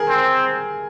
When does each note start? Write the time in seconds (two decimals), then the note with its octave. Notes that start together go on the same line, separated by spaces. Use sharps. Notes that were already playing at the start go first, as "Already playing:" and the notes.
Already playing: G#4 A#4
0.09 C4